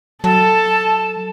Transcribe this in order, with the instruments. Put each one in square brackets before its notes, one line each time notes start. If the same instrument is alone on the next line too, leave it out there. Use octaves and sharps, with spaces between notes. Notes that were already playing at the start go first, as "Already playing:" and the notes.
[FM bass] F#3 [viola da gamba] A4 [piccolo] A5